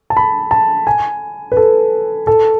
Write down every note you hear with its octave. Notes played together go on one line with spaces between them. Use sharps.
A5
B5
A5
G#5
B4
A4
A4